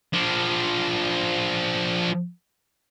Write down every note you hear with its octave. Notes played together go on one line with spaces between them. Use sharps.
F3 D4